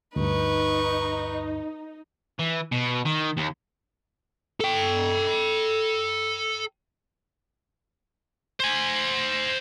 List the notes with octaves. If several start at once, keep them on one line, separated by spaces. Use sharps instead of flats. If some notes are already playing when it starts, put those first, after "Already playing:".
D2 G2 D#4 B4 C#6
E3
B2
D#3
D#2
A4 G5
C5 G#5